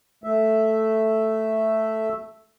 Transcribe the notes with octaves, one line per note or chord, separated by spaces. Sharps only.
A3 E5